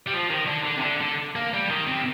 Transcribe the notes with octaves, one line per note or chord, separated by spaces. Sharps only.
G3
F3
D#3
D3
D3
C3
D3
D3
A#3
G3
D#3
C3